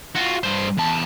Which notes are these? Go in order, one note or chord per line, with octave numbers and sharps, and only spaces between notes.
F4 F#4
G2 C5
E2 A5